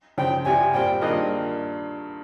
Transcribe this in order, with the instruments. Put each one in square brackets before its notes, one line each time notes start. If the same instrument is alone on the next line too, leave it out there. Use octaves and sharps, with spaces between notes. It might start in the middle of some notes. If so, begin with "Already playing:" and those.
[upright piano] C#3 F3 C4 [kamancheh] G5
[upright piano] C2 C3 G3 C4 F4 [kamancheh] G#5
[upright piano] A#2 G3 C4 [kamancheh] G5
[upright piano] G2 D#3 A#3 F4 G#4 [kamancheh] D#5